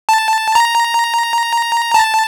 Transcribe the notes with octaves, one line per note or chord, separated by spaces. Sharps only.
A5
A#5
A5